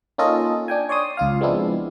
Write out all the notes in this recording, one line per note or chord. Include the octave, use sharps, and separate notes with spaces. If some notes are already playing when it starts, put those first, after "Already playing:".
A#3 C#4 D#4 F4 A4 D#5
D4 G5 G#5
C#5 D5 C6 D#6
C#2 F4 F5
F3 G#3 B3 C4 D4 E4